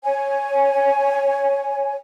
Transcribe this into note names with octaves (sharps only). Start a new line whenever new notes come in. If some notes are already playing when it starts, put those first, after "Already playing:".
C#5 G#5